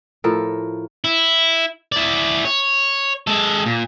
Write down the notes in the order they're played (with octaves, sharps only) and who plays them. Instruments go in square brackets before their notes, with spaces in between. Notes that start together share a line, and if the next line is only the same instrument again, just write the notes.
[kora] A2 F3 A4 A#4
[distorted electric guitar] E4
E4 D5
C#5
G#3 A4
A#2